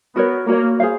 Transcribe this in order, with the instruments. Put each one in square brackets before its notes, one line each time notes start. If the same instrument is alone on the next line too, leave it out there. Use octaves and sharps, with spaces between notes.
[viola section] B3 [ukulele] F#4 A#4 C#5
[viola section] A#3 [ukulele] F#4 A#4 C#5
[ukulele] G#4 C5 F5